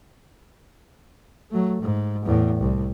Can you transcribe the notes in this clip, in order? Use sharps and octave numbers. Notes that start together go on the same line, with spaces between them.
F#3 A3
G#2
E2 A2
C2